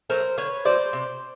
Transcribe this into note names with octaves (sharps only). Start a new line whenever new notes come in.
F#3 A3 A#4 C5
D3 B4 C#5
F#3 A3 C5 D5
C3